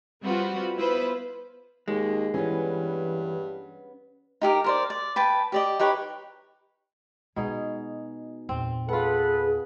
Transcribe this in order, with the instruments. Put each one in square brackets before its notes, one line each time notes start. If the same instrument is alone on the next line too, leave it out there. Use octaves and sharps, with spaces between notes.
[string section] G3 C4 F4 F#4 B4
B3 E4 F4 B4 C5
[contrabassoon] D#2 [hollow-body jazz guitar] G#3
[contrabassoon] G2 [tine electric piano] E3 [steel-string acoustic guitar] B3 C#4
[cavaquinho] D#4 G4 G#4 A#4
A#4 C5 D5
D5
B4 G5 A5
G4 D5 D#5
D#4 G4 B4 C#5
[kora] B2 D#4 G#4 [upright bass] G#3
[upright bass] E2 A#2 [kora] C4
[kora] F4 F#5 [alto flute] G#4 [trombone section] A4 B4